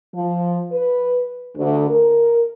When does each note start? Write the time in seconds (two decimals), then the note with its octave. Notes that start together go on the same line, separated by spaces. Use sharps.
0.14 F3
0.72 B4
1.56 D2
1.90 A#4